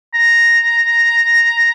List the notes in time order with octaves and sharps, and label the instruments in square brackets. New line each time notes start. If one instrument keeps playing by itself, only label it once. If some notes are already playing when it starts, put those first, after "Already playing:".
[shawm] A#5